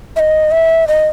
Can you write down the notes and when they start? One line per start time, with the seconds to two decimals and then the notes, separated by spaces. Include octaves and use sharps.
0.16 E5
0.20 D#5
0.51 E5
0.88 D#5